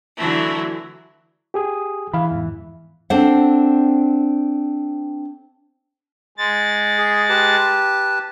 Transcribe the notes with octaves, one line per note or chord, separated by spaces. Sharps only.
D3 E3 F#3 A3
G4 G#4 D#6
E3 F5 B5
E2 G#2
C4 D4 A4 C5 F#5
G#3 A6
G#4
G4 B4 A5